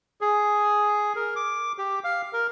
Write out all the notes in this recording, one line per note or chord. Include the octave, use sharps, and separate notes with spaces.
G#4
A#4
D6
G4
F5
A#4